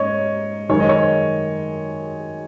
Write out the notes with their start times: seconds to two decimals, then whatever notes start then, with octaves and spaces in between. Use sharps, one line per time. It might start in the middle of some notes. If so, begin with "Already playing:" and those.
Already playing: G#2 A#3 C#4 C#5 D#5
0.69 F#2 D#3 G#3 C#5
0.80 D#5
0.89 C#5